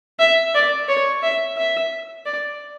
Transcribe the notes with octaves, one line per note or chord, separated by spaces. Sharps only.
E5
D5
C#5
E5
E5
D5